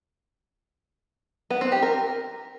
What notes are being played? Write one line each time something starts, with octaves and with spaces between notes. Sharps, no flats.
B3
C4
G4
A#4